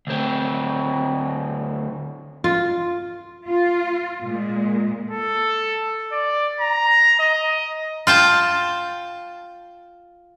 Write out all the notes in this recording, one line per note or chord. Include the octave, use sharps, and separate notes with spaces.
D2 C4
F4
F4
A#2 G#3
A4
D5
A#5
D#5
F4 G5 A5